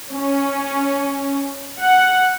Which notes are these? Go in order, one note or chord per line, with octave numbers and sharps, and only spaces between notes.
C#4
F#5